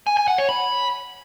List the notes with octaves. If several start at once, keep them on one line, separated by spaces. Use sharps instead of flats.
G#5
G#5
F#5
C#5
B5